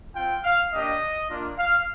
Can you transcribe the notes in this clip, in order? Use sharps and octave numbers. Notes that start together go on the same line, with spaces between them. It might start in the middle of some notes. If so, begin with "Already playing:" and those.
C4 F4 G5
F5
A#3 D4 G4 D#5
A#3 D4 F4
F5